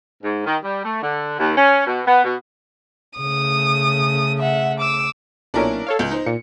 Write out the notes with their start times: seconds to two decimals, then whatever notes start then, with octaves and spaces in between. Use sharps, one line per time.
0.24 G#2
0.46 D#3
0.63 G3
0.84 A3
1.02 D3
1.39 D#2
1.57 C#4
1.87 B2
2.07 B3
2.24 B2
3.19 C#3 A3 D#6
4.39 E5 F#5
4.80 D6 E6
5.54 B1 A#2 C#4 D4 E4 A#4
5.87 A4 C#5 F5
5.99 C#2 G6
6.11 D#4 C5
6.26 A#2 C#7